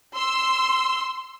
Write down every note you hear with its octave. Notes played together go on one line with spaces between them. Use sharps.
C6 E6